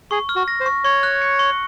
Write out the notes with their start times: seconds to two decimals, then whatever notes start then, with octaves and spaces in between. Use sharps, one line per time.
0.11 G#4 C#6
0.29 F6
0.36 F#4
0.48 A#6
0.60 C5
0.66 C#6
0.84 C#5 C#6
1.03 F#6
1.22 C#7
1.39 C#6